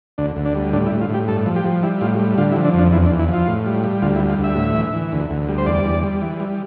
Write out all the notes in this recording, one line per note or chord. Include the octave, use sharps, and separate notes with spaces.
D2 D4
D2
D4
G3
A2 D4
E4
A2
F4
A2 G4
G2 A4
F3
G4
F3
G3 E4
A2 F4
G3
D3 F4
E4
F3
D4
F2
D4
E2 E4
D4
E2
E4
F3
F4
A2
G3
G3
D2 F4
E4
G3
F4
D2
E5
A2
E3
E3
D2
D2
G3
C5
E2 D5
E2
G3
E3
G3